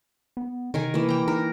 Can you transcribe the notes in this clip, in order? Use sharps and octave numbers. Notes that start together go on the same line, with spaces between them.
B3
C3 D#3 A#4 G#5
E3 A#3
G5 A#5
D#4 A#4